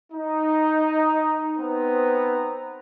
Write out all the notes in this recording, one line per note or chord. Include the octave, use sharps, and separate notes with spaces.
D#4
B3 C4 D#4 B4 C5 A#5